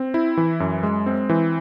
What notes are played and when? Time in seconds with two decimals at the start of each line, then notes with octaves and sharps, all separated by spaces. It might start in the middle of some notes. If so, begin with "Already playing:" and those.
Already playing: C4
0.14 E4
0.37 E3
0.60 F#2
0.83 G#3
1.06 C4
1.29 E3